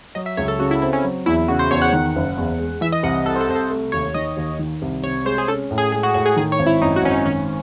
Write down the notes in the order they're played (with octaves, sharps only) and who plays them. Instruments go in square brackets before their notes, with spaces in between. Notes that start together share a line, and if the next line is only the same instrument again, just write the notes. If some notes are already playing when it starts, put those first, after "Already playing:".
[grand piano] F#3 [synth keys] D#5
[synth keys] E5
[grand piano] C#2 [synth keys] C#5
[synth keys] A4
[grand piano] C#3 [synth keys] F#4
[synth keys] E4
[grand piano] C4 [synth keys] E4
[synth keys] C#4
[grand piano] F#3
[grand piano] E2 [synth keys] E4
[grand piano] C#3 [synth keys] F#4
[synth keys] C5
[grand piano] E2 [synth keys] C#5
[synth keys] F#5
[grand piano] D#3
F#1
E2
G#3
[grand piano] E3 [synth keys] E5
[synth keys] D#5
[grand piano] C2 [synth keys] F#5
[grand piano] C3 [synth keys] A4
[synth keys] C5
A4
[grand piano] C2 [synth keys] C5
[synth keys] A4
[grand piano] A3
[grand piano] D#2 [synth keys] C#5
[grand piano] D#3 [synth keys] D#5
[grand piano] D#2
D#3
C2
[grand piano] C3 [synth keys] C#5
[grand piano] G#3 [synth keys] C5
[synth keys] G#4
[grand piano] C#4 [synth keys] A4
[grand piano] A2
[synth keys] G#4
[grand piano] G#3 [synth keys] G#4
[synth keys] F#4
[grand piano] A2 [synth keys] F#4
[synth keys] G#4
[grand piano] D#3 [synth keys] G#4
[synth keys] C#5
[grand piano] G#1
[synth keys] E4
[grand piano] F#2 [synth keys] D#4
[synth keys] F#4
[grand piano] G#1 [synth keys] C#4
[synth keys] D#4
[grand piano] D#3 [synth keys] C#4